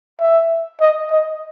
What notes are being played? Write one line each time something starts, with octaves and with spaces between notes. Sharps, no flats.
E5
D#5
D#5